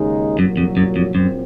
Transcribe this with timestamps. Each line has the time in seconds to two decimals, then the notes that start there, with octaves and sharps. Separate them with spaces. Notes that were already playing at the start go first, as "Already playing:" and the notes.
Already playing: D#2 C#3 G#3 D#4
0.39 C2 F#2 A#2 F#3
0.57 F2
0.77 F#2
0.96 F2
1.14 A#1 F#2 A#2 F#3 C4